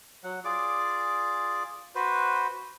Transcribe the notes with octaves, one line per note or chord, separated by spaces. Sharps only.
F#3 F#5
F4 G#4 D5 D6
F#4 B4 C5